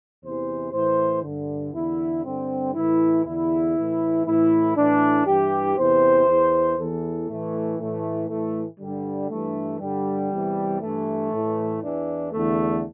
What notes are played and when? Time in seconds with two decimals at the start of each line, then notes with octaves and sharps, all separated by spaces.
0.23 E2 C3 E3 C5
0.73 A2 E3 C5
1.23 G2 D3
1.74 E2 D3 E4
2.24 G2 D3 C4
2.75 A2 E3 E4
3.25 E2 D3 E4
3.75 A2 E3
4.26 A2 E3 E4
4.76 A2 E3 D4
5.26 G2 E3 G4
5.77 E2 C3 E3 C5
6.27 E2 E3
6.78 E2 E3 A4
7.28 A2 E3 A3
7.79 A2 E3 A3
8.29 A2 E3 A3
8.80 G2 D3 G3
9.30 G2 E3 A3
9.80 G2 D3 G3
10.31 E2 C3 E3
10.81 G2 E3 A3
11.31 A2 E3
11.82 E2 E3 D4
12.32 E2 D3 A3